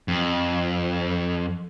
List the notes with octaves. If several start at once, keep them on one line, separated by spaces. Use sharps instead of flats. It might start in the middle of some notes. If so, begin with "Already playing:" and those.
F2